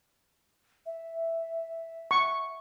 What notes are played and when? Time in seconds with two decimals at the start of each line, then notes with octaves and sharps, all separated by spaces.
0.86 E5
2.11 C#6